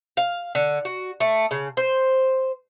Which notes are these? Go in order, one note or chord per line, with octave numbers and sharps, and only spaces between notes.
F5
D3
F#4
A3
C#3
C5